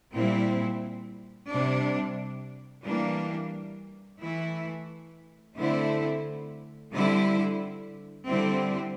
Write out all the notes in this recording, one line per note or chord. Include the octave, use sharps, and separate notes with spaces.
A#2 G3 C4 E4
C3 G3 D4
E3 G3 A#3 D4
E3 A3 E4
D3 A3 C4 E4
D3 G3 C4 E4
D3 G3 C4 E4